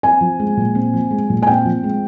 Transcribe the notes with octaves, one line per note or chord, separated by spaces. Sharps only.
C4 G#5
F3
G#3
A#2
C4
F3
G#3
A#2
G#5
C4 G5
F3
G#3